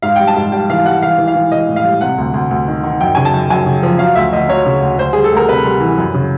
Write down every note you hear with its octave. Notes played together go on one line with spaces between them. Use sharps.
G#2 F5
G3 G5
A5
G#2
G3 G5
E3 F5
G3 F#5
E3 F5
E3
F5
E3
E3 D#5
A2
F5
G3
C3 F#5
D2
D2
D2
D#3
D#3
F#2 G5
C#3 G#5
A5
F#2
F#2 G#5
C#3
F3
F#3 F5
D2 E5
D2 D#5
F#3 C#5
C#3
D2
D2 C5
G3 G#4
A4
D2 A#4
C3 B4
G3
E3
F#2
C#3